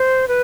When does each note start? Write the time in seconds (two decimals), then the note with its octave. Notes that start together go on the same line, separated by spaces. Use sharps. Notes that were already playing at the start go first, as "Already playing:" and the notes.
Already playing: C5
0.28 B4